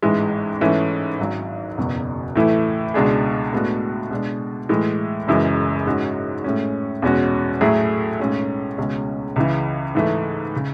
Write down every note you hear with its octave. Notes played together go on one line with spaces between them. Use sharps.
A1 G#2 E3 G#3
G#2 E3 A3 C#4
G#1 G#2 F#3
F#1 E2 B2 F#3
A2 E3 A3 E4
C#2 B2 G#3 D4 G#4
A2 G#3 B3 D4 F#4
B2 G#3 D4
A2 E3 G#3
F#1 F#2 E3 G#3
G#2 G#3 C#4 F#4
A2 G#3 C#4
E2 B2 G#3 C#4 F#4
A2 F#3 A3 E4 G#4
B1 A2 G#3 C#4
C#2 B2 G#3 C#4
C#2 C#3 E3
G#2 E3 A3
C#3